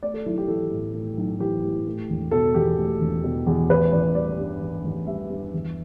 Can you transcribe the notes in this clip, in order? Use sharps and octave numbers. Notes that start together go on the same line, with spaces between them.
A3 D5
A4
B1 E4
G4
E3 A4
A2
A3
B1
E3 G4
A2
A3
E1
B2 A4
E2 G4
A3
E1
B2
E2
A1 B4
A1 D5
G3 D5
G2
A1
A1
G3 E5
G2
E2